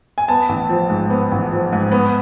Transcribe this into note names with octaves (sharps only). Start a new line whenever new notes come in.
G#5
B3 A5
A1
F3
G#2
B3
A1
F3
G#2
B3